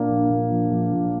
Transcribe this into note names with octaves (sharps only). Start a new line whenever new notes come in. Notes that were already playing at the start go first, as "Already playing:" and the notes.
Already playing: A#2 A#3 D4
A#1
A#2
F3
A#1
A#2